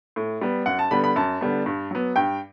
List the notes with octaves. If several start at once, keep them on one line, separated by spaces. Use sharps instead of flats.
A2
G3 B3
F#2 F#5
A5
D3 G3 B3 B5
B5
F#2 A5
D3 G3 B3
G2
F#3 B3
G2 G5